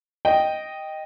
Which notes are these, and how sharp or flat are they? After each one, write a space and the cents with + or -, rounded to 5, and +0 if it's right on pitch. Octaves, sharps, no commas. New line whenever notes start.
D#5 +0 G5 +0